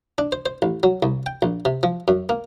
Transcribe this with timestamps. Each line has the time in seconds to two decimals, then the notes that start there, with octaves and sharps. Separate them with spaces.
0.18 D4
0.32 C5
0.46 C5
0.62 A1
0.83 F#3
1.03 C2
1.26 G5
1.42 A#1
1.65 C3
1.83 F3
2.08 F#2
2.29 A#3